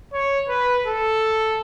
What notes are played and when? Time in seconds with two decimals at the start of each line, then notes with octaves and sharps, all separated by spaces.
0.13 C#5
0.49 B4
0.87 A4